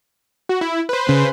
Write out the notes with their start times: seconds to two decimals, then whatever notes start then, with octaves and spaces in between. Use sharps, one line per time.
0.49 F#4
0.61 E4
0.89 B4 C5
1.09 C#3